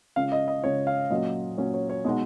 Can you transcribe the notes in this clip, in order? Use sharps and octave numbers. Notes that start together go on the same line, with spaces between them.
C#3 G#3 C#4 F4 F5
D#5
D#5
C#3 G#3 C#4 F4 C#5
F5
A#2 F#3 C#4 D#5
A#2 F#3 C#4 C#5
C#5
C#5
B2 G#3 D#4 F#4 D#5